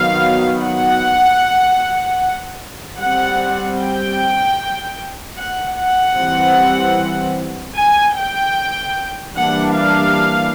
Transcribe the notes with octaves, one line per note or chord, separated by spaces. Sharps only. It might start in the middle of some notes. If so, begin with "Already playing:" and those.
Already playing: D#3 F#3 B3 F5
F#5
G3 C4 F#5
G5
F#5
F#5
E3 G3 C4
G#5
G5
E3 G3 A#3 D4 F#5
F5